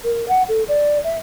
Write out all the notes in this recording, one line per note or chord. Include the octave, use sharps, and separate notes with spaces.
A#4
F#5
A4
D5
E5